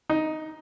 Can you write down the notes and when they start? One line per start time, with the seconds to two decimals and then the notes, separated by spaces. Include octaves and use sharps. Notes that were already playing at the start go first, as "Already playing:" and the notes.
0.10 D#4